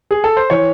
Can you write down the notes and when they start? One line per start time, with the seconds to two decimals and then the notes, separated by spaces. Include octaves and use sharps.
0.11 G#4
0.24 A4
0.37 C5
0.50 E3 C#5